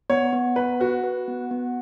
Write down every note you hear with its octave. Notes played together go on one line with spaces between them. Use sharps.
B3 C#5
B3
B3 B4
F#4 B4
B4
B3
B3